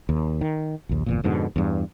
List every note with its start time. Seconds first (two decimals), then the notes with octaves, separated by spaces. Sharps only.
0.09 D#2
0.41 D#3
0.89 A#1 D#2
1.06 G1 E2 A#2
1.24 F2 G#2 B2 D3
1.56 E2 G2